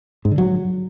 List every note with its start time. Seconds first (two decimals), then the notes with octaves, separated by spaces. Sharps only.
0.25 G#2
0.31 D3
0.38 F#3